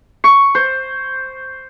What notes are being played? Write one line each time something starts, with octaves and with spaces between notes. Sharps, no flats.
C#6
C5